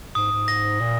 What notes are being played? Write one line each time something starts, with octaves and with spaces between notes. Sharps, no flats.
G#2 D#6
G#2
A#6
A#2